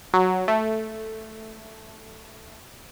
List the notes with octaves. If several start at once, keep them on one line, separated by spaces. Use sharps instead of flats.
F#3
A3